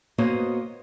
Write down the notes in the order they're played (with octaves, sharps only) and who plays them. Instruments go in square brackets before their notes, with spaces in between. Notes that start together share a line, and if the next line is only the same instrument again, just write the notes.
[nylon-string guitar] A#3 B3 F#4 C5 C#5 D#5